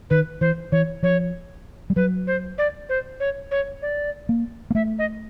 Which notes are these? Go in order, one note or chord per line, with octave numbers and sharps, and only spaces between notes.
D#3 B4
E3 C5
E3 C#5
F3 C#5
G3
F#3 B4
C5
D5
C5
C#5
C#5
D5
A#3
A#3
A3 E5
D#5